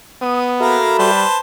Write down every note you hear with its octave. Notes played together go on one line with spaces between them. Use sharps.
B3 D#6
A#3 F#4 A4 E5 F5 A#5 B5
G3 B4 C5 A5